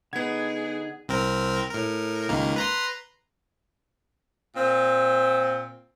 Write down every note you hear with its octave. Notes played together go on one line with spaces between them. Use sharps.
D3 B3 D#4 G#4 F#5 G#6
C2 C4 A#4
A2 A#4
C#2 D#3 A#3
B4 A#5 C6
A#2 C4